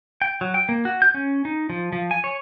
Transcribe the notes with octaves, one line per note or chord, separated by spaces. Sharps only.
G5
F#3
G5
A#3
F#4
G6
C#4
D#4
F3
F3
G#5
C#5